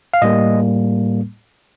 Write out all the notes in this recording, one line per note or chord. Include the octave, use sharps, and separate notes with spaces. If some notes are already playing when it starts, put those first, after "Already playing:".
F5
A2 G3 A#3 D#5